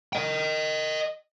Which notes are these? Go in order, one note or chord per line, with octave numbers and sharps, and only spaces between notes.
D#5 G5